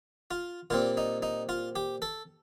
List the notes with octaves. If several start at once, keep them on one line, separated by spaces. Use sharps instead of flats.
F4
A#2 G3 C4 F4
D#4
D#4
F4
G4
A4